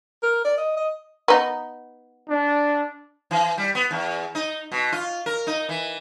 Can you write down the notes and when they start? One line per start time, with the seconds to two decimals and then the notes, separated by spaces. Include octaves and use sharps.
0.23 A#4
0.45 D5
0.58 D#5
0.77 D#5
1.28 B3 D#4
2.29 D4
3.31 E3
3.58 G3
3.75 B3
3.91 E2
4.35 D#4
4.72 B2
4.92 F4
5.26 A#4
5.47 D#4
5.69 E3